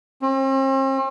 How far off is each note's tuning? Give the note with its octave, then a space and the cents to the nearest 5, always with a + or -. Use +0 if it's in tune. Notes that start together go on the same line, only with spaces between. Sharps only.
C4 +45